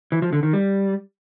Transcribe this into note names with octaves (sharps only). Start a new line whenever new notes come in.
E3
F3
D3
D#3
G3